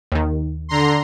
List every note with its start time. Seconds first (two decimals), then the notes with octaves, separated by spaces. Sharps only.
0.12 D#2 D#3
0.69 D3 A#5 C6